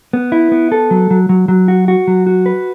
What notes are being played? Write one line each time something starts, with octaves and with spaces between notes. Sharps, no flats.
B3
E4
B3
A4
F#3
F#3
F#3
F#3
F#4
F#4
F#3
F#4
B4